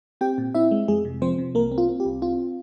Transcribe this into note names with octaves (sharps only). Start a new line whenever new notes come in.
C4 G4 G5
A#2
C4 E4 E5
G#3
F2 G#3 G#4
C3
F3 C4 C5
C3
C2 A#3 A#4
C4
F4
C4
G4
C2
C4 F4